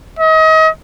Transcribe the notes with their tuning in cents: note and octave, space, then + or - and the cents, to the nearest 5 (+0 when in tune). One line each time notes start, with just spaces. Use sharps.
D#5 +35